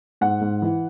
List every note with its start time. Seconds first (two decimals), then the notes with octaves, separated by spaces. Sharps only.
0.21 G#2 F#5
0.41 G#2
0.62 E3